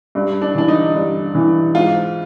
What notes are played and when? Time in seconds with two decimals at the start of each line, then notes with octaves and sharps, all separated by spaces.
0.15 G2
0.42 D4
0.55 E3 D4
0.68 D#4
0.94 G2
1.35 E3
1.75 G#2 F4